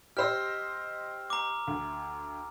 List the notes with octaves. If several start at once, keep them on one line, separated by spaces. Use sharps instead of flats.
G4 C5 D#5 E6 F6
A#5 D6
D2